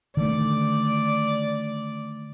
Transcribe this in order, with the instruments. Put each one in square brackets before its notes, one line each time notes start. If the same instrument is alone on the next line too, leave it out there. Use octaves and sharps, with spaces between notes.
[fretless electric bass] D3 D#3 A3 [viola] D5